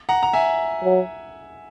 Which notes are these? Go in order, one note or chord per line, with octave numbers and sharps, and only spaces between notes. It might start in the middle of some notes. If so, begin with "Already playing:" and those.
F#5 A#5
A#5
E5 G#5
F#3